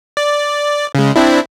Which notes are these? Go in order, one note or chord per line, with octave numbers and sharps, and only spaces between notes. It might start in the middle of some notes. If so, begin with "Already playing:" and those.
D5
C#3 G#3
C4 D4 E4